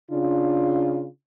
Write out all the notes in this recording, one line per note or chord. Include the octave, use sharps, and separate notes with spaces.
C#3 D4 F4